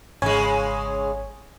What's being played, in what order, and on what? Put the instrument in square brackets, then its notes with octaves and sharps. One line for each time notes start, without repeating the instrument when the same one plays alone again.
[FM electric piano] G#1 C#5 G#5 [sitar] C#3 G#3